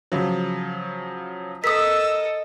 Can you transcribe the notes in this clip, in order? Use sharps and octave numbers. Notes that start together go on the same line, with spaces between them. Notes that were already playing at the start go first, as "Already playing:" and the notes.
C#3 F3 F#3
A4 A#4 D#5 D#6 E6 B6